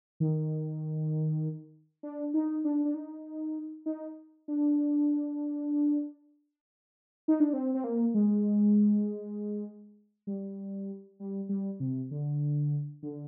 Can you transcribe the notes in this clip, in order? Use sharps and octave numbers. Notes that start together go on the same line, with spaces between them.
D#3
D4
D#4
D4
D4
D#4
D#4
D4
D#4
D4
C4
C4
A#3
G#3
G3
G3
G3
C3
D3
D3